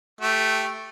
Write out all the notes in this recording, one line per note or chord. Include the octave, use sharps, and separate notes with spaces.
A3 G4